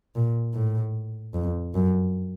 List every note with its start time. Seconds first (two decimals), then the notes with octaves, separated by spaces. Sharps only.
0.15 A#2
0.54 A2
1.34 F2
1.74 F#2